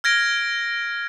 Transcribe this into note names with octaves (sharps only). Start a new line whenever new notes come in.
F6 G#6 A#6 D7